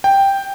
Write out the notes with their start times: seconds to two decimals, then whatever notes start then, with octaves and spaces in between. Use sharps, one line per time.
0.04 G5